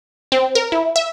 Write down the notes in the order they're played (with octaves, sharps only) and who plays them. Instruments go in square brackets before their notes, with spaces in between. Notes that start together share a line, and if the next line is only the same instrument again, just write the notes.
[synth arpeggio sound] C4
A#4
E4
E5